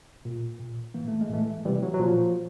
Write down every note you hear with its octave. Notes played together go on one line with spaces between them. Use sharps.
A#2
A#2
A2 E3 A#3
A3
G#3
A2 E3 A3
C3 E3 G3
F#3
F#3
A#2 F3